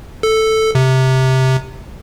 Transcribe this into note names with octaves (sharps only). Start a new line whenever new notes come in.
A4
C3